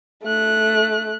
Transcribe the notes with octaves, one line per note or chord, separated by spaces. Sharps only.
A3 F#6